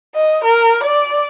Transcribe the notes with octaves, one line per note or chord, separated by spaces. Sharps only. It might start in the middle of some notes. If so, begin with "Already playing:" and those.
D#5
A#4
D5